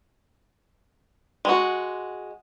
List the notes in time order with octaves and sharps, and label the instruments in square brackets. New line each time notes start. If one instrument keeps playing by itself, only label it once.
[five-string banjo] G#3 F#4